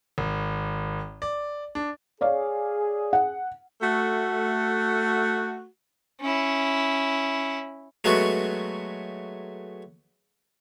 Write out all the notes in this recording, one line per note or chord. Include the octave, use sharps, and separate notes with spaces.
G#1
D5
D4
G#4 C#5 D5 F5
F#5
A3 F#4
C#4 E4
F#3 G#3 A3 B3 F#4